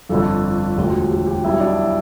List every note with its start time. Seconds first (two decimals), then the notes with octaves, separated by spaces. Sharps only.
0.09 G1 F2 D3 A4
0.77 E1 D2 D3 F3 G4
1.11 G4
1.27 G4
1.43 B1 B2 G3 E4
1.60 D4
1.77 E4